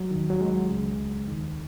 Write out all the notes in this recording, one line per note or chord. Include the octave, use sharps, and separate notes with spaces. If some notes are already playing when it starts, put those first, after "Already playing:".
Already playing: F#3
D#2 D#3
F#3
G#3
C#2 C#3
D#2 D#3